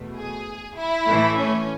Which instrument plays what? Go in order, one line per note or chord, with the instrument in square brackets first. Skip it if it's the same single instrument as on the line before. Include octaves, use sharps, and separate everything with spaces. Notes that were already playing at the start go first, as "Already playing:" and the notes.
Already playing: [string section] E2 B2 A3
G#4
E4
A2 E3 A3
C#4